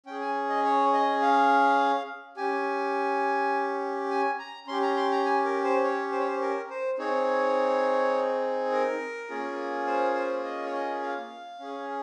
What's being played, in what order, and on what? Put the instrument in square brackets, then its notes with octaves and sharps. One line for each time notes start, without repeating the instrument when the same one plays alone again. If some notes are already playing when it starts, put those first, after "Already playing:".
[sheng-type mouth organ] C#4 G#4 G5
G#5
D#5
C#5
D#5
F5
C#4 G4 G#5
G#5
A#5
C#4 G4 C6
A#5
C6
A#5
G#5
A#4
C5
C#5
C5
C#5
C5
A#4
C5
C4 D#4 G#4 C#5
A#4
A#3 C#4 F4 G#4
C5
C5
D#5
C#5
D#5
F5
C#4 G#4